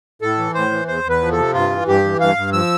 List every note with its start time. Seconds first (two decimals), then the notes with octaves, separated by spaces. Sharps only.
0.22 A2 A4
0.38 E3
0.54 A2 C5
0.71 E3
0.87 E2 C5
1.04 E2
1.09 B4
1.21 F3
1.32 A4
1.38 C3
1.54 G2 F4
1.71 E3
1.87 G2 G4
2.04 E3
2.20 G2 F5
2.37 G2
2.53 F3 E6